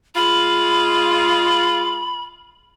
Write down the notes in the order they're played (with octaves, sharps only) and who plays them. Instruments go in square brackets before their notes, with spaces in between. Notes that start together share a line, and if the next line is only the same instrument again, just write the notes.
[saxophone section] G#3 F4 [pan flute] B5